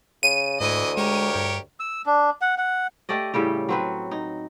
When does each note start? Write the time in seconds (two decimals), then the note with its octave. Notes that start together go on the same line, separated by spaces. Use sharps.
0.23 C#3 D#7
0.60 D2 G#2 E3 D#5
0.97 G#3 G4 A#4 C#5
1.35 G2
1.80 E6
2.06 D4
2.41 F#5
2.58 F#5
3.09 A3 G4 D5 D#5
3.34 A2 C#3 G3 G4
3.69 F#3 C4 B4
4.11 D#4